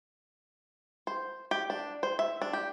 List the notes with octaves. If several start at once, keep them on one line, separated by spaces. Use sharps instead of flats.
C5
G4
D4
C5
E5
D4
G4